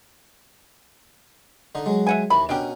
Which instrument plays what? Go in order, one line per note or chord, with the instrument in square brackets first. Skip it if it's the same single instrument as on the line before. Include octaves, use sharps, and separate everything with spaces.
[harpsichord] D3 D#4
F#3 G#3
[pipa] E5 F#5 G#5
[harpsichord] D#2 E3 [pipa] B5
[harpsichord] B2 C#4 A#4 [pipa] D4 G4